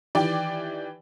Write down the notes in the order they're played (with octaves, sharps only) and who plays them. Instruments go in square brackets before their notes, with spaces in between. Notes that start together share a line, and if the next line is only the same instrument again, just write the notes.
[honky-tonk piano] D#3 E3 G4 D5 G5